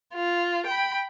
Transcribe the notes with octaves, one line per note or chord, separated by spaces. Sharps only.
F4
G5 B5